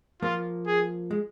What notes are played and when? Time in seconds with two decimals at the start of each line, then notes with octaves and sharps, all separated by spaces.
0.22 F3 A#3 F4
0.67 G#4
1.11 G#3